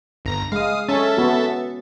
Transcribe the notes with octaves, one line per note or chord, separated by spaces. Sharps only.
G1 A#5 A#6
G#3 F5 D#6
C#4 A4 E5 A6
B3 F#4